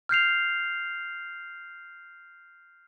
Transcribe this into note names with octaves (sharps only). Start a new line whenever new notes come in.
F6 G6 C7 F7